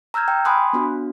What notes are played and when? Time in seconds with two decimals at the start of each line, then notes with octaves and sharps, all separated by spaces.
0.14 A#5 E6 F6 G6 G#6
0.28 G5
0.45 G#5 B5 C6 D#6 F#6
0.73 B3 D4 F#4